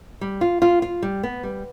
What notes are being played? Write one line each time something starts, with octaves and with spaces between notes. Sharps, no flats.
G3
F4
F4
F4
G3
B3
G3